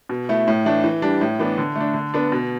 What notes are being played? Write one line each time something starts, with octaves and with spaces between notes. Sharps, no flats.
B2
A3 E4
A2
E3 A3 D4
E3
G3 D4
A2
E3 B3 D4
D3
A3 D4
D3
B3 D4
B2